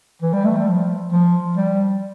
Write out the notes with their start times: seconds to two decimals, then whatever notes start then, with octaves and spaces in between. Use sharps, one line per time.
0.22 E3
0.33 G3
0.45 A3
0.56 G3
0.67 F3
1.12 F3
1.57 G3